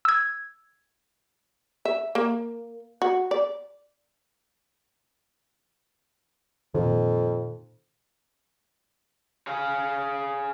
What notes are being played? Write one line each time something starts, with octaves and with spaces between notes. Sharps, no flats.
E6 G#6
E5
A#3
F#4
D5
F2 A#2 D#3
G#4 F5